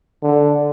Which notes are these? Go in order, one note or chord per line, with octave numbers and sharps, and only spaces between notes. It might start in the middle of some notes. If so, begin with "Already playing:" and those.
D3